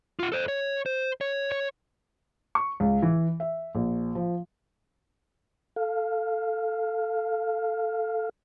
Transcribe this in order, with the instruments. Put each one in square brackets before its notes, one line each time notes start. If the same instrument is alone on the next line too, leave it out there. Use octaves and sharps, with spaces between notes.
[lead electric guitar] F4 F#5
A4 C5
C#5
C5
C#5
C#5
[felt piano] C#6
C#2
E3
E5
A#1
F3
[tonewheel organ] A4 F5